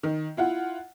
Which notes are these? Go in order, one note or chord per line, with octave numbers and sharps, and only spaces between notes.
D#3
E4 F4 F#5